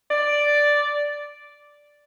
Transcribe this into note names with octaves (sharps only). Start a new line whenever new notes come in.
D5